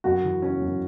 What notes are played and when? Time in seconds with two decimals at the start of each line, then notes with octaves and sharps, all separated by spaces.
0.04 F#2 F#4
0.24 E3
0.42 C#3 C#4
0.62 F#2